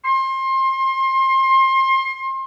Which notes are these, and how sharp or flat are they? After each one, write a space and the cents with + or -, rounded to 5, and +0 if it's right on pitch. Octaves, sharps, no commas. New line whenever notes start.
C6 +30